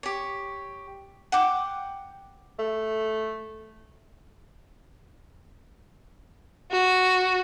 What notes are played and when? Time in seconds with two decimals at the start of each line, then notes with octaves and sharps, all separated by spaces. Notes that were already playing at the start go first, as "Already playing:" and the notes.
0.03 G4 C#5
1.32 F#5 G5 D6
2.59 A3
6.72 F#4